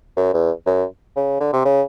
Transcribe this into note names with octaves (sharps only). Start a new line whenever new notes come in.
F#2
E2
F#2
C#3
D3
C3
C#3